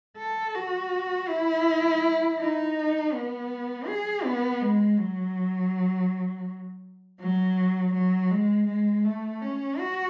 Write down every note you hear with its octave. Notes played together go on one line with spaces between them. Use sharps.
A4
F#4
E4
D#4
B3
G#4
B3
G#3
F#3
F#3
F#3
G#3
G#3
A3
C#4
F#4